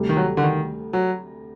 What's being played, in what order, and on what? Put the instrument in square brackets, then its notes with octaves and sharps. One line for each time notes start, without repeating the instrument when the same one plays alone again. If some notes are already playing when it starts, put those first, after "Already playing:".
Already playing: [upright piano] D2 C3 G3
[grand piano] D#3
F#3
D3
D#3
F#3